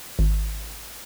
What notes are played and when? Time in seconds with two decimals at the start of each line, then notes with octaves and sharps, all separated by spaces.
0.19 G#1